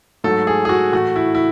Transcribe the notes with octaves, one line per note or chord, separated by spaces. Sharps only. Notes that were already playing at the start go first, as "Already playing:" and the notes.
G#2 F#3 A3 A4
G#4
G#4
F#4
A2 E3 A3 F#4
E4
E4